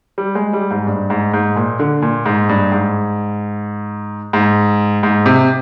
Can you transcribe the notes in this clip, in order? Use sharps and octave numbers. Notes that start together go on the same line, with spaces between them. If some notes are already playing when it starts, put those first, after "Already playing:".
G3
G#3
G3
G#2
G2
G#2
G#2
A#2
D3
A#2
G#2
G2
G#2
G#2
G#2
C3